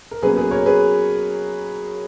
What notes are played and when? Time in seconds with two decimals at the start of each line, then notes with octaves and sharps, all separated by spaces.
0.11 A#4
0.22 B2 F#3 A#3 C#4 G#4 B4
0.37 G#4 B4
0.51 A#4 C#5
0.66 G#4 B4